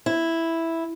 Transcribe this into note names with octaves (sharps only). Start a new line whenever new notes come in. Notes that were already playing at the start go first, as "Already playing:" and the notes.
E4